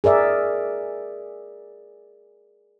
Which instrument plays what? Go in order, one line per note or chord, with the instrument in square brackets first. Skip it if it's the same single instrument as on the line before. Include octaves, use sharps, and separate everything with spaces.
[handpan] G#4 A#4 D5 E5